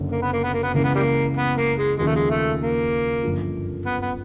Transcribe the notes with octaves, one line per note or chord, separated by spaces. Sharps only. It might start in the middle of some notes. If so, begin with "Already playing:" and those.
Already playing: F#1 F#2 D3 F#3
A#3
B3
A#3
B3
A#3
B3
C#2 C#3 E3 G#3 A#3
B3
G3 A#3
B3
A#3
G#3
D#2 C#3 F3 G#3
A3
G#3
A3
A#3
G1 F#2 D3 F3
B3
B3